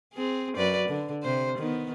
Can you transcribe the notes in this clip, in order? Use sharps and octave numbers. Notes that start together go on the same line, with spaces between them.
C4 G#4
F#2 B4 D5
D3
C3 C5
D#3 B3